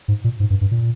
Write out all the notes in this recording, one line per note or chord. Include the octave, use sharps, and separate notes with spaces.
G#2
A#2
G#2
G2
G2
A#2